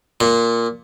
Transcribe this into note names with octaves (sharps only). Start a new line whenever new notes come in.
A#2